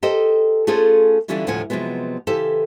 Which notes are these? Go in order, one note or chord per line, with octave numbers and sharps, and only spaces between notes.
G4 A4 A#4 C5 D#5
A3 C#4 F4 G#4 A4 C5
D3 E3 G3 C#4 E4 F4
D2 A2 C3 F3 F#5 G#5
C3 F3 F#3 G#3 B3
C#3 E3 G4 A4 C5